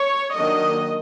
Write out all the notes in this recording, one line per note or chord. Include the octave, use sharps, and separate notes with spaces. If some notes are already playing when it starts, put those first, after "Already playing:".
Already playing: C#5
D#3 F#3 A#3 D4 D#5